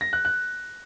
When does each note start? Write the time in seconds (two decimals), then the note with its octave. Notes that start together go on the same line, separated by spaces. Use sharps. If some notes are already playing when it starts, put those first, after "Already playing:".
0.01 A#6
0.13 F#6
0.25 F#6